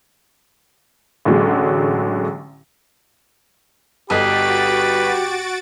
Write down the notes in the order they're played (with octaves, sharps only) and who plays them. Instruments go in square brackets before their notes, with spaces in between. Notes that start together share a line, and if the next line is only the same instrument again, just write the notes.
[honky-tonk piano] A1 D3 F#3 G#3
[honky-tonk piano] G1 A4 D#5 [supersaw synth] F#4 A6 D7 [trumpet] G4 [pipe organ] B4